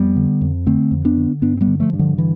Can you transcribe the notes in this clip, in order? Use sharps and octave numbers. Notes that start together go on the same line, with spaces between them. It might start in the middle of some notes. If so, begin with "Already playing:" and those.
Already playing: F2 G3 B3
D3
F2
D3 A3 C4
F2
B3 D4
D3
G2 B3 D4
C4
G3 B3
D3
F3 A3
G2
D3 F3
D3 E3